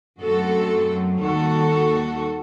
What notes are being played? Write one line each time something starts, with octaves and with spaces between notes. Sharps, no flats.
F#2 F#3 A3 C4 F#4 A4
D#2 D#3 G3 F#4 A4